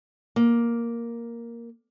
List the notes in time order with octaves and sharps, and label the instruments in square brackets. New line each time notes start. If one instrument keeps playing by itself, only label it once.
[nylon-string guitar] A#3